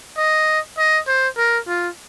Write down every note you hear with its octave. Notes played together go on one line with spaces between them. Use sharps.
D#5
D#5
C5
A#4
F4